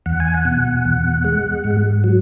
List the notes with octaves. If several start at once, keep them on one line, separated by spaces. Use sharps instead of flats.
E2 F#5
G#5
F#5
B2
E2
G#3
G#2
F#3